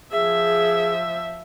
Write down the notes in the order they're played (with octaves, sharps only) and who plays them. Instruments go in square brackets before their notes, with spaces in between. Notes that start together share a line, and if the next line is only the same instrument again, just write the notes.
[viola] F3 E5 [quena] G#4